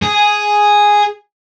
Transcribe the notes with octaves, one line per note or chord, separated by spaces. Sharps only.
G#4